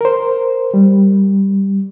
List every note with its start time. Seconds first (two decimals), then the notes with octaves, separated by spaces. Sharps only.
0.01 A#4 C5
0.74 G3